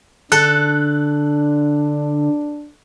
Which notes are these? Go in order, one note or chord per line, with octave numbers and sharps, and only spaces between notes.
D3 D4 A4 F#6